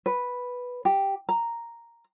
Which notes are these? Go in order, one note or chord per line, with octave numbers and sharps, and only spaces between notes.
B4
G4
A#5